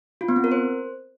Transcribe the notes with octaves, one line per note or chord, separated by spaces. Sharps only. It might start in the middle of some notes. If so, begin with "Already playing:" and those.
F4
B3
C4
A#4
C5